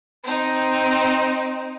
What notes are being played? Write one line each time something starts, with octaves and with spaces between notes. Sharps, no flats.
C4 D#4